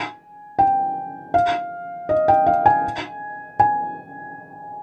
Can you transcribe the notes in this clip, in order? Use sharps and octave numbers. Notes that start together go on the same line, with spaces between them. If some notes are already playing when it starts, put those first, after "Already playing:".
Already playing: G#5
G5
F5
D#5
G5
F5
G#5
G#5